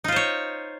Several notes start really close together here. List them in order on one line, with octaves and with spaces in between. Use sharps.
D#4 F4 C5 C#5